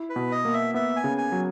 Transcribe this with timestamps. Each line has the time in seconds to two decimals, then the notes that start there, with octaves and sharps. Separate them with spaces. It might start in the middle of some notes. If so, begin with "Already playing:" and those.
Already playing: E4
0.10 B4
0.16 B2
0.32 D#5
0.45 A#3
0.53 E5
0.74 B3 E5
0.97 G#5
1.04 C#3
1.18 G#5
1.32 F#3